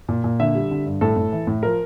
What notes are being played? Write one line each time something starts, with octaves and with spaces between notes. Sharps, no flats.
A#2
A#2
D3 E5
G3
D3
G2
A2 A4
A2
E3
A2
F3 A#4